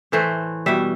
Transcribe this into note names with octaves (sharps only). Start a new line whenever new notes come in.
A2 E3 A3 C5
B2 G3 E5